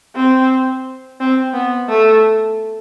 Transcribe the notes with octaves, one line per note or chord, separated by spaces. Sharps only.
C4
C4
B3
A3